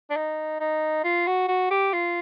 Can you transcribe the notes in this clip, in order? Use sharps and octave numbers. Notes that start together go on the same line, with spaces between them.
D4
D#4
D#4
F4
F#4
F#4
G4
F4